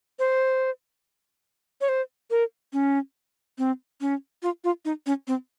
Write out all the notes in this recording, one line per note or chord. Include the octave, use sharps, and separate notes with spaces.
C5
C#5
C5
A#4
C#4
C4
C#4
F4
F4
D#4
C#4
C4